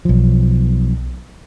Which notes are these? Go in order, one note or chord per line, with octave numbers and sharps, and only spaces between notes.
B1 F3